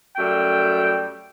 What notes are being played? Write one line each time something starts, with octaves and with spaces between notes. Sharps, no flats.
F#2 G3 A3 G5